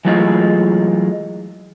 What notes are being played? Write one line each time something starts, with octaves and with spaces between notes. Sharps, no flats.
E3 F#3 G#3 A3 F4